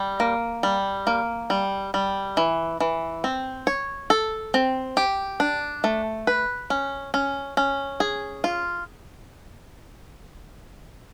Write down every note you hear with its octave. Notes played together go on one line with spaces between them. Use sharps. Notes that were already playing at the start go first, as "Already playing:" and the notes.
Already playing: G3
A#3
G3
A#3
G3
G3
E3
E3
C4
C#5
A4
C4
G4
D4
A3
B4
C#4
C#4
C#4
G#4
F4